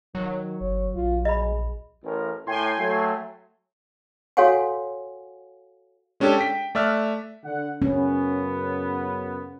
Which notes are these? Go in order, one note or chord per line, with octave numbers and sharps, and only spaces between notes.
D#3 F#3
G1 C#5
A#1 F4
G#4 D#5 B5
A1 A#4
A2 G5 G#5 C6
F#3 A3
F#4 A4 C#5 F5 F#5 G#5
G#3 C#4 D4 G4 A4
G5 B6
A3 D5 E5 F6 F#6
D3 F#5
F#2 C#3 B3 C#4